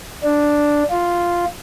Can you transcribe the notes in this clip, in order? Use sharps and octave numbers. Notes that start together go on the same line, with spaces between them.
D4
F4